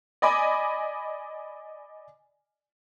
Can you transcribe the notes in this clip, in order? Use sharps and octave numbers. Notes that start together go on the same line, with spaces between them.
D5 D#5 G#5 B5 D6